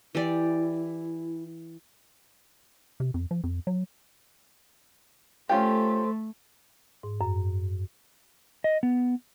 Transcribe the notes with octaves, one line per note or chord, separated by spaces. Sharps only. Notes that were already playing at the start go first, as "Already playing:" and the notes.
E3 E4 G4 D5
C3
F2
F3
F2
F#3
A3 C#4 F4 G4 A4 C5 C6
G#2
F#2
D#5
B3